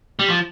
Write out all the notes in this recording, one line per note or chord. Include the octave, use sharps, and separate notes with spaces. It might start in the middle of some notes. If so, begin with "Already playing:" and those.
G3
F3